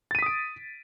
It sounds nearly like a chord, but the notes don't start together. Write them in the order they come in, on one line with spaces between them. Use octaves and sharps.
A6 D#7 B6 D#6 D7